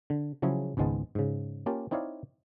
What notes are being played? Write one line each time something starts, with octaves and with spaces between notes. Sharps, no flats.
D3
C#3 F3 F#3 C#4 E4 G#4
G#1 C#2 G#2 G#3 B3 A5
G#2 C#3
A#3 C#4 F4 G4 A5
C4 D#4 E4 C#5 D5 F5